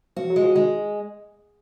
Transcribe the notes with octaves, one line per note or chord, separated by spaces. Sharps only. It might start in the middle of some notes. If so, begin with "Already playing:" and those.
F3 F#4
F#3
G#3
F3
D#3 G#3